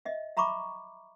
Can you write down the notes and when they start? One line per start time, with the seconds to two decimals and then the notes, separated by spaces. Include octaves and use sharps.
0.05 D#5 E5
0.37 E5 A#5 B5 C#6 D6